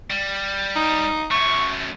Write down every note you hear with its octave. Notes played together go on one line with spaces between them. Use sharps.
G3
D#4
F#2 A3 C#6